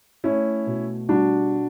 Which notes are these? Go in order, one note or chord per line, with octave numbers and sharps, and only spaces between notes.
A3 C#4 E4
B2
G3 D4 F#4